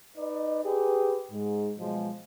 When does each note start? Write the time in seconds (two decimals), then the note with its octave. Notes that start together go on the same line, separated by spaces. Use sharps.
0.17 D#4 B4 D5 D#5
0.65 G4 G#4 B4
1.32 G#2 G#3
1.79 B2 F3 F#3 G#3